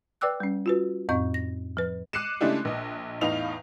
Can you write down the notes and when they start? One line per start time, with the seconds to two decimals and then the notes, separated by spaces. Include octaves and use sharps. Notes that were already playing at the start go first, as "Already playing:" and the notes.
0.21 B4 D5 G5 D6 E6 F#6
0.40 G3 C#4
0.66 F4 F#4 B4
1.09 F2 A2 C4 D#5 C#6 G6
1.34 A#6
1.77 F3 B4
2.13 D6 F#6 C7 C#7 D#7 E7
2.41 C#3 G#3 A3 D4 E4 G4
2.65 A#1 D#5
3.21 E2 A2 D#4 F5 F7